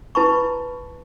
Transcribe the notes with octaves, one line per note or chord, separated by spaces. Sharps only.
E4 B4 A5 B5 C#6